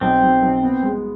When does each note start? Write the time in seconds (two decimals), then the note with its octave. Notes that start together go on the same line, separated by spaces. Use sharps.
0.01 B1 C4
0.23 B1
0.42 B1
0.63 B3
0.83 G#3